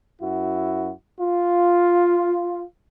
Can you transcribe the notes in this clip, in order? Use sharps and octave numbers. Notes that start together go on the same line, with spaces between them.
F#2 E4 F#4
F4